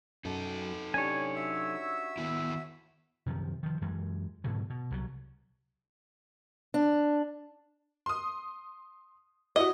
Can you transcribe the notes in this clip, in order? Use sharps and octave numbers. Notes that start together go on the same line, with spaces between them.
F#2 D#4 A4
C#4 D4 G4 C#5 G#5
F#4 E5 E6
D#3 B3 E4
F#2 C3 D#3 F3
D#3 F3
F#2 E3 G#3
G#2 B2 D3 F#3
B2
C2 F3 F#3
D4
C6 D#6
E4 F#4 D#5